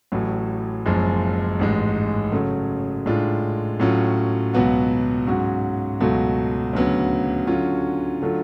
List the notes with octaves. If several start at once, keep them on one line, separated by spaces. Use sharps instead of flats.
A1 A2 F#3
F#1 F#2 F3 G#3
A1 G#2 G#3
C#3 F#3 A3
A2 G#3 D4 F4
A2 F#3 C#4 F4
C#2 B2 F#3 B3 F#4
G#2 F#3 C#4 F#4
C#2 B2 F#3 A3
D2 C#3 F#3 B3
D3 F#3 C#4 F4
D3 F#3 A3 F4